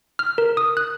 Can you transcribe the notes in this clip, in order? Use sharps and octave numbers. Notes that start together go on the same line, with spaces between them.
F6
A#4
D#6
F#6